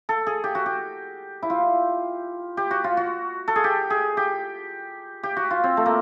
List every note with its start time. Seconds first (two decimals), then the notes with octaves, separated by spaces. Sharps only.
0.09 A4
0.27 G#4
0.44 G4
0.55 F#4
0.66 G4
1.42 E4
1.50 F4
2.57 G4
2.71 F#4
2.84 F4
2.97 F#4
3.48 A4
3.56 G#4
3.64 G4
3.90 G#4
4.17 G4
5.23 G4
5.37 F#4
5.51 F4
5.64 C4
5.77 A3
5.86 A#3